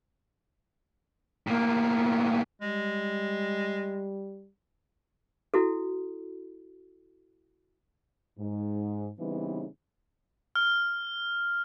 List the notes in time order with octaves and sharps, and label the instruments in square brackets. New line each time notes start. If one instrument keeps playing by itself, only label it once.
[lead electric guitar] A2 A#3
[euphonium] G3 [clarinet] G#3
[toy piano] E4 F#4 A4
[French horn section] G#2
C#3 E3 G3 B3 C4 D#4
[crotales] F6